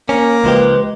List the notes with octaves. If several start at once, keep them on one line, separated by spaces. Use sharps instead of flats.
A#3 C#4
C#2 F3 G#3 G4 B4